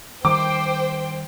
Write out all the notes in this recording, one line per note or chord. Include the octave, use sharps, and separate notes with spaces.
D#3 G3 C5 G5 D6